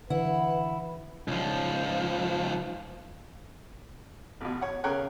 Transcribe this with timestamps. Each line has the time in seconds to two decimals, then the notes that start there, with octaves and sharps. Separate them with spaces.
0.10 D3 E3 E4 B4 F#5
1.28 C#2 F3
4.41 A1 B2
4.61 C#5 F#5
4.84 C#3 A#4 C#5 G5 F#6